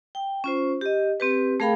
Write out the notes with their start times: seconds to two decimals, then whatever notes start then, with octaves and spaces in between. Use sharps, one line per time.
0.15 G5
0.44 C#4 F4 C5
0.81 G4 D#5
1.20 C4 G4 B4
1.60 A3 G#4 A#4 F5 G5 B5